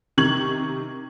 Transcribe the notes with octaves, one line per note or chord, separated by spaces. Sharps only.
C3 D#3 C#6 G#6 F#7